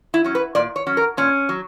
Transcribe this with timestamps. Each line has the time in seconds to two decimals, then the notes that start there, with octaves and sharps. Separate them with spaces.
0.14 E4
0.24 F#3 C#4
0.35 B4
0.55 A#2 D5
0.76 C#5
0.87 F#3 C#4
0.97 A#4
1.17 A#2 C#4
1.49 F#3